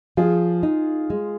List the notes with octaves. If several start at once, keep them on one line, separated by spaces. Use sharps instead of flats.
F3 F4 G#4
D#4
G#3